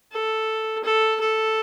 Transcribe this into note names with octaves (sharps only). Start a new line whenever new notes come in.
A4
A4
A4